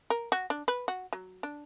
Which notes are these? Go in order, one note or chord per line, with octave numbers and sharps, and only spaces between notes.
A#4
F#4
D4
B4
F#4
F#3
D4